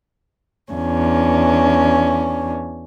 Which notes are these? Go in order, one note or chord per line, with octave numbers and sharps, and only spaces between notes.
E2 C#4 D4